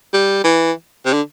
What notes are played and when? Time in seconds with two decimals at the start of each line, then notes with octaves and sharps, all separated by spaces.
0.14 G3
0.44 E3
1.06 C3
1.13 D3